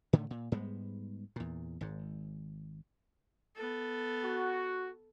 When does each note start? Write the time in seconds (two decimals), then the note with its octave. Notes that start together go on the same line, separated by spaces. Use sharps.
0.13 A2 D3 D#3 A3
0.30 A#2
0.52 G#2 G3 G#3 B3
1.36 E2 A#2
1.81 G#1 G#2
3.56 B3 A4
4.24 F#4